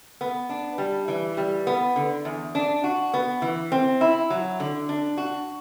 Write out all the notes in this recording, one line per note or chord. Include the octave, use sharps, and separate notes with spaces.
B3
D4
G3
E3
G3
B3
D3
E2
D4
F#4
B3
E3
C4
E4
F#3
D3
D4
F#4